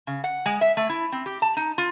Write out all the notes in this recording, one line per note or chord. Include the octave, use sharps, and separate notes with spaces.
C#3
F#5
G#3
E5
A3
E4
C4
G4
A5
D#4
F4